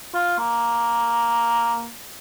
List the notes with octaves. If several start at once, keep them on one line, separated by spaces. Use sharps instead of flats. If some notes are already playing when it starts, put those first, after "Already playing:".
F4
A#3